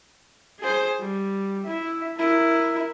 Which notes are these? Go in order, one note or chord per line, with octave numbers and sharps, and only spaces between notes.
G#4 C5
G3
E4 E5
E4 A#4